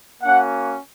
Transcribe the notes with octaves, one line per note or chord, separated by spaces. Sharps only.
A#3 C#4 F#4 F#5